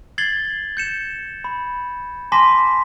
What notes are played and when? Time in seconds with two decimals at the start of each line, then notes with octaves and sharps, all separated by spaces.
0.18 G#6 A6 C7 F#7 G7
0.77 G6 C#7 E7
1.44 B5
2.32 G#5 A5 C6 D6 A#6 B6